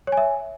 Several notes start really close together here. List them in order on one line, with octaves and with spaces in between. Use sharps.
C#5 G#5 E5